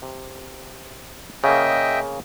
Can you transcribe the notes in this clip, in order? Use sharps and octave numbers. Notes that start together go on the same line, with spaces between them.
C3
C#3 A#3 D#5 E5 G5